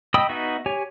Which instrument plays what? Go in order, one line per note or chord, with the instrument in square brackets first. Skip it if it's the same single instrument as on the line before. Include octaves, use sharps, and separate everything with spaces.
[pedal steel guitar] D#5 G5 B5 D#6 E6
B3 D#4 F#4 E5
G4 C#5 G#5